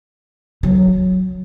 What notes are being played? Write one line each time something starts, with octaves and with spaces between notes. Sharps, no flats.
F#3